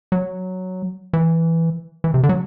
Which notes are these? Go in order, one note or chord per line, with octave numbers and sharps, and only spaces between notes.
F#3
E3
E3
C3
D3
F#3